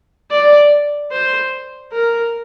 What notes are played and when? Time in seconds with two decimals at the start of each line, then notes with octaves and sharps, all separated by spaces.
0.31 D5
1.11 C5
1.92 A#4